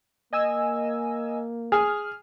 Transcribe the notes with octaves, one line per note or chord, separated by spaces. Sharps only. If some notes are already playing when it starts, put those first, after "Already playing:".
A#3 D#5 G#5 E6
G#4 F6